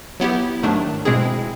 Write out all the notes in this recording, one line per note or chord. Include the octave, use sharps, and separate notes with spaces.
F#3 B3 E4 G4
G#2 D#3 F#3 A3 D4
B2 G#3 C4 E4 G#4